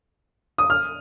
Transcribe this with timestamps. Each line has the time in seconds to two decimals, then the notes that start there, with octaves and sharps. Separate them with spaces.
0.58 D#6
0.70 F6